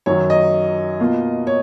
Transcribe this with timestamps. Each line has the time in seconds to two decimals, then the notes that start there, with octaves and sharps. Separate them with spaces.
0.06 F#2 D#3 F#3 C#5
0.30 D#5
1.00 B2 A#3 F4
1.47 C#5